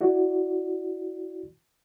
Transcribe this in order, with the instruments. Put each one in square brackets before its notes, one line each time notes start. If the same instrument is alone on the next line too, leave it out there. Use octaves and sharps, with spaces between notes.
[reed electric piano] E4 F#4 D5